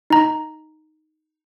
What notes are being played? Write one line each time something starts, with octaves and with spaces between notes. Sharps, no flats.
D#4 A#5